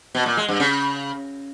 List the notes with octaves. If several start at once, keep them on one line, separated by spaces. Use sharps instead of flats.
B2
A#2
G#3
G2
C#3